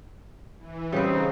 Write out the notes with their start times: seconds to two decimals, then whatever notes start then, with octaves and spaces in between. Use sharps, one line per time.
0.58 E3
0.92 C#3 G3 B3 C4 D#4 B4